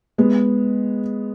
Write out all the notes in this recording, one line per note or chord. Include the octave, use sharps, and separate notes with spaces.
G#3 B3